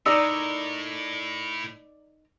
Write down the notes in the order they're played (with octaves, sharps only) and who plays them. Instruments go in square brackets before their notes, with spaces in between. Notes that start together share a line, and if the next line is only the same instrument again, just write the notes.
[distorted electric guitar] A2 [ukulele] D#4 A#4 [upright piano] D5 [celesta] E6